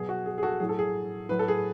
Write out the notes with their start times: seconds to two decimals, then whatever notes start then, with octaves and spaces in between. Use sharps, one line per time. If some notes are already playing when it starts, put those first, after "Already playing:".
Already playing: B2 F#3 G#4
0.09 F#4
0.26 G#4
0.38 G#4
0.43 F#4 A4
0.60 A2 F#3 G#4
0.69 A4
0.79 G#4
1.29 A2 F#3 B4
1.39 A4
1.48 G#4